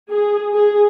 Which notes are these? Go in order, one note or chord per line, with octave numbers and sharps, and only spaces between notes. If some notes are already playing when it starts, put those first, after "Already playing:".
G#4
G#4